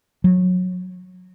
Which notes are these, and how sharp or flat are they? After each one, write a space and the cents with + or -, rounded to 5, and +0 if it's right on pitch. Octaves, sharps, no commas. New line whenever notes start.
F#3 -25